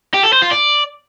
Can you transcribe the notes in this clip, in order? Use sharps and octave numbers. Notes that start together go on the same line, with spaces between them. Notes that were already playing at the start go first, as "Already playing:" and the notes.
G4
A4
C5
F4
D5